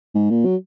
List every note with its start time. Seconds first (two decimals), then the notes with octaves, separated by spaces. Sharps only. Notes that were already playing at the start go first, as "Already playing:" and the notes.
0.15 G#2
0.30 A#2
0.45 F#3